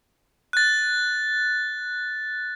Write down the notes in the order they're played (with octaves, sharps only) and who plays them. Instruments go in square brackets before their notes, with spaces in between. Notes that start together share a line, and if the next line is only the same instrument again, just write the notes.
[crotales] F#6 A6